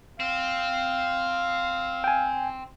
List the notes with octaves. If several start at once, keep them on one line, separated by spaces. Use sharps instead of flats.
C4 F5
G5 G#5